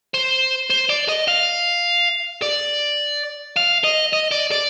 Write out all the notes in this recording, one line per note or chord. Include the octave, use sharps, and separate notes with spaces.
C5
C5
D5
D#5
F5
D5
F5
D#5
D#5
D5
D5